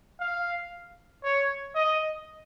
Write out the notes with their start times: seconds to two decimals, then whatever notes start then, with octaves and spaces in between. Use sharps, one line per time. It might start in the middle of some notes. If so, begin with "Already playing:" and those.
0.20 F5
1.24 C#5
1.75 D#5